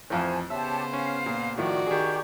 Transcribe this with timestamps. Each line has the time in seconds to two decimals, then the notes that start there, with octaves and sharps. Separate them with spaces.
0.10 A1 F2 C5 F5 G#5 A5
0.50 C#3 B3 G4 C5 C#5 E5 A5
0.93 C#4 F5
1.26 A#2
1.58 A2 D#3 F3 F#4 D5
1.86 D#3 G4 G#4 C#6